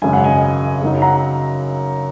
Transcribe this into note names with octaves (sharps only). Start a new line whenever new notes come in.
G#1 F#2 C#3 G#5
F#5
D#5 G#5
F#2 C#3 F#3 D#4
F#5 A#5